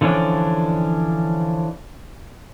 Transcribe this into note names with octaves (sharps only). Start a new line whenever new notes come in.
D3 E3 F3 C#4 D4